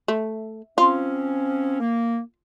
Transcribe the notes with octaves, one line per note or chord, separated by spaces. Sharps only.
A3
F3 C4 C#4 F4
A#3